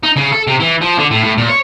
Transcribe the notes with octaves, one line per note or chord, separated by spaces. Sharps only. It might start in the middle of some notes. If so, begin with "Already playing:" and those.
D#4
C#3
A4
C3
E3
F3
D3
A2
A2
A#2
C#5